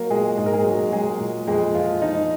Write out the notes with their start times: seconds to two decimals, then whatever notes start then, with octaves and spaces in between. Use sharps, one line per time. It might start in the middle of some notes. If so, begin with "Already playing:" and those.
Already playing: F#3 A#3 A#4
0.10 A#2 G#3 G#4
0.37 G#2 G#4
0.46 A#4
0.54 G#3 G#4
0.65 F#3
0.92 F#3 G#3 G#4
1.19 A#2
1.47 F2 G#3 G#4
1.74 F3 F4
2.02 F3 D#4